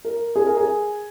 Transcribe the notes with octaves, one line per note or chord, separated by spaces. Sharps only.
A#4
G#4
A#4
G#4